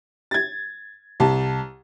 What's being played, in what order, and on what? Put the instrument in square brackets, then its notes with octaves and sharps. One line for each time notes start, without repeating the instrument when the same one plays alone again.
[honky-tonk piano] G#6 A6
C2 A5